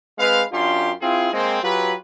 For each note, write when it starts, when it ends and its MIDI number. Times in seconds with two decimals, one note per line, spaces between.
0.18 0.42 56
0.18 0.42 60
0.18 0.42 71
0.18 0.42 77
0.51 0.90 42
0.51 0.90 62
0.51 0.90 65
0.51 0.90 67
0.51 0.90 84
1.00 1.30 60
1.00 1.30 64
1.00 1.30 65
1.00 1.30 68
1.33 1.60 56
1.33 1.60 58
1.33 1.60 60
1.62 1.93 54
1.62 1.93 65
1.62 1.93 67
1.62 1.93 71